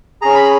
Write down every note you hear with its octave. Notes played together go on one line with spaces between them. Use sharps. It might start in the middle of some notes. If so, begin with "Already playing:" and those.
C#4 G#4 A#5
B5